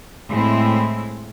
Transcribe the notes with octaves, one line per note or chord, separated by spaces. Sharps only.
A2 G#3 C4 E4